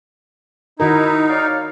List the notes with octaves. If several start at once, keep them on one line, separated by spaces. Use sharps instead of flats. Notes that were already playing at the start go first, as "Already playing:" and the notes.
D#3 D#4 E4 F#4 A#4
C#5 D5 F5